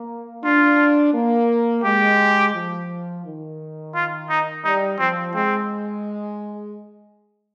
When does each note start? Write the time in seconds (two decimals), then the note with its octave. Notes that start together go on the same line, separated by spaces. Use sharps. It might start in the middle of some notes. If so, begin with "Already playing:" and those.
Already playing: A#3
0.44 D4 F4
1.14 A#3
1.84 G#3 G4
2.54 F3
3.25 D#3
3.95 F4
4.29 D#4
4.65 G3 D#4
4.99 F3 C4
5.35 G#3 C4